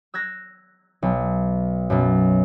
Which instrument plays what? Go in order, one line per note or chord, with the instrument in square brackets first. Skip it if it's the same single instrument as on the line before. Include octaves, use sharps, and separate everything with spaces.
[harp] E6 F#6 G#6 A#6
B1
F#2 B2